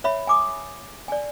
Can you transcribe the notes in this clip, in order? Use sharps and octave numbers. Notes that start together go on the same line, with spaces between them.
C#5 E5 B5
G#5 D6 D#6
D5 G#5